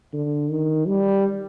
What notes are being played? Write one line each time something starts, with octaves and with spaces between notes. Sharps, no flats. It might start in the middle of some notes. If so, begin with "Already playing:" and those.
D3
D#3
G3